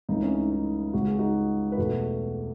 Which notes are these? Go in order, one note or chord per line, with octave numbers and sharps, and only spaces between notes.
C#2 C#3 E3 A3 D#4
C#4 E4
D#4
D#4
C#2 C#3 G#3 F#4
G#4
D#4 F#4
B4
E2 B2 A3 F#4 A4